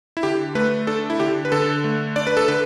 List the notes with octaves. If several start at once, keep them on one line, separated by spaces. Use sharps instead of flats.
E4
D3 G4
A3 B4
D4 A4
E4
D3 G4
B4
D3 A4
A3
D4 D5
B4
A4
D3 B4